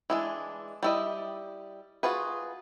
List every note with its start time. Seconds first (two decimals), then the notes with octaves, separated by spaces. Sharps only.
0.10 E3 G#3 D4
0.83 G3 E4 D#5
2.03 F4 F#4 G#4 B4